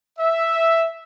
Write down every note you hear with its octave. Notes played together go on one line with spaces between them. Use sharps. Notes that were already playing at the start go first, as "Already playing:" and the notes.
E5